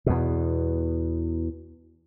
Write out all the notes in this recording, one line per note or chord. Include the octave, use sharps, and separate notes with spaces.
E2 B2